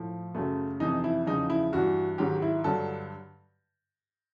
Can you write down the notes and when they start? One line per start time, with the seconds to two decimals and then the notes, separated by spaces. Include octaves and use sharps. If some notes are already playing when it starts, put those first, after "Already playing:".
Already playing: A2 F3
0.35 F#2 C#3 F#3 A3
0.80 F2 C3 E3 D#4
1.04 E4
1.26 E2 C#3 F3 D#4
1.50 E4
1.72 G2 E3 F#4
2.18 G#2 D#3 F#3 G4
2.42 E4
2.64 G2 D3 F#3 A4